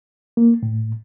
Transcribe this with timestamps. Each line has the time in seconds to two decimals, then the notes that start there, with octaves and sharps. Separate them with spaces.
0.37 A#3
0.63 A2